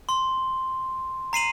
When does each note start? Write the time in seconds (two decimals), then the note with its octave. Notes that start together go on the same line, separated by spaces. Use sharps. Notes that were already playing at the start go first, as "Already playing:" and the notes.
0.09 C6
1.33 A#5 C7 D#7 F#7